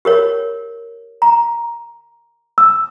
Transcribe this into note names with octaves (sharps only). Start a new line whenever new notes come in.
G4 A#4 C#5
A#5
E6